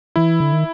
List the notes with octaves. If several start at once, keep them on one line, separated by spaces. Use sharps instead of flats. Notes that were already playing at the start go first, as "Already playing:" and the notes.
E3 E4
D3
D#3